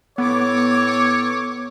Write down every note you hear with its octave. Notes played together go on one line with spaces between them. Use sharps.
A2 B3 A4 C#5 D6